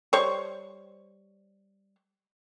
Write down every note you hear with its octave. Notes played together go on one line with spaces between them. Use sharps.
G3 C5 C#5 C#6